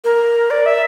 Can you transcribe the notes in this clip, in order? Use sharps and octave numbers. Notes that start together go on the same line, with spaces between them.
A#4
D5
E5